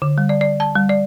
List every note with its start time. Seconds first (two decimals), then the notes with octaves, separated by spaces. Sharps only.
0.02 D3
0.18 G3
0.29 D5
0.41 D5
0.60 A5
0.76 G3
0.89 D5